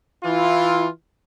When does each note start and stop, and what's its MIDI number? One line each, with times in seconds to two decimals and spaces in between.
0.23 0.86 52
0.23 0.86 64
0.23 0.86 65